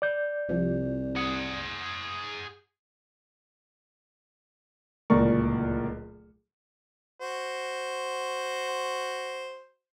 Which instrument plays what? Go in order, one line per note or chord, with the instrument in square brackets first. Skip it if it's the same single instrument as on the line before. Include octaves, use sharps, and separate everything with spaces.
[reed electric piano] D5 G6
[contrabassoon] C2 [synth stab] C3 F3
[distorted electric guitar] G#4 F#5
[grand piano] D1 C#2 A#2 A#4 D5 C#6
[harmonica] F#4 C5